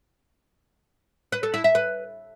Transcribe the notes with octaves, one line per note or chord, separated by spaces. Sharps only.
B4
A4
E4
E5
B4